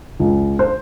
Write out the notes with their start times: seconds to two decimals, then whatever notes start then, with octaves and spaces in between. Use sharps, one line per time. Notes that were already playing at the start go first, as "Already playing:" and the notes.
0.20 C#2
0.59 C5